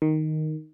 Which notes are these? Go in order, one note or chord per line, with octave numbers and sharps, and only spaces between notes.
D#3